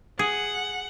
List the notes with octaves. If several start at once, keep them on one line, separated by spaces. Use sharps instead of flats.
G#4 F#5